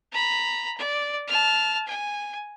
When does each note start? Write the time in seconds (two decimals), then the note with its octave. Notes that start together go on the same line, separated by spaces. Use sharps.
0.12 A#5 B5
0.78 D5
1.28 A5 F6
1.87 G#5